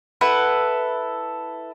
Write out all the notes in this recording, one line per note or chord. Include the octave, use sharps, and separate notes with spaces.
E4 A4 B4 F#5